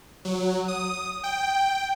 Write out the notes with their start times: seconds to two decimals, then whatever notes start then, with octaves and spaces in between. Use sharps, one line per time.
0.25 F#3
0.68 D#6
1.23 G5